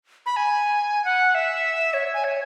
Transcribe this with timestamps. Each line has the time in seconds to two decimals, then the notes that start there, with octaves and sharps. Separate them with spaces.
0.26 B5
0.36 G#5
1.05 F#5
1.35 E5
1.94 C#5
2.14 G#5
2.24 C#5